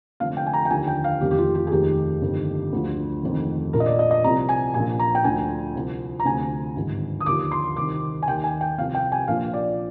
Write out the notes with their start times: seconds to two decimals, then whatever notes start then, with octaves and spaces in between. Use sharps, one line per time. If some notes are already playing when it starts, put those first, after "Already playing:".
0.20 F1 F2 D3 F3 F5
0.37 G5
0.46 G#5
0.53 A#5
0.65 G5
0.70 D#2 D3 F3 G#5
0.87 G5
1.04 F5
1.21 F1 F2 D#3 G4
1.31 G4
1.38 F4
1.55 G4
1.67 G#4
1.71 F1 D#2 D#3 G4
2.21 G1 F2 D#3
2.73 D2 D3 F3
3.22 F1 F2 D#3
3.73 A#1 A#2 F3 A#4
3.80 D#5
3.86 D5
3.99 D#5
4.11 D#5
4.24 C2 C3 F3 A#5
4.49 G#5
4.74 A#1 A#2 F3 G#5
4.99 A#5
5.15 G5
5.24 D2 D3 F3 G#5
5.75 C2 C3 F3
6.20 A#5
6.25 D2 C3 F3 G#5
6.76 G#1 G2 D3 F3
7.20 D#6
7.26 D#2 D3 F3 D6
7.51 C6
7.76 C2 C3 D#3 D6
8.22 G#5
8.27 D#2 D#3 G5
8.44 G#5
8.61 G5
8.77 C2 C3 F3 F5
8.94 G5
9.12 G#5
9.28 A#1 A#2 F3 F5
9.53 D5